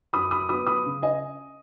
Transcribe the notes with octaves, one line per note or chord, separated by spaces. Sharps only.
F#2 B5 D#6
B5 D#6
F#3 B3 B5 D#6
B5 D#6
C#3
D#5 G#5